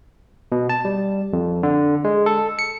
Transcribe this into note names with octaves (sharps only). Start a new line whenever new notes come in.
B2
A5
G3
F2
D3
G#3
A4
C#7